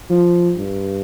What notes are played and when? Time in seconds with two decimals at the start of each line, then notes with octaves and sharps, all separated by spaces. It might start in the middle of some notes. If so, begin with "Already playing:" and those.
0.10 F3
0.57 G2